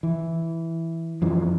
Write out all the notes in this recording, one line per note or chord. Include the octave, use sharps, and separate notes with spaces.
E3
F#2 E3 F3